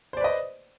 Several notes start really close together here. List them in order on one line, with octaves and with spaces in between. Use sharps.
C5 D5 B4 D#5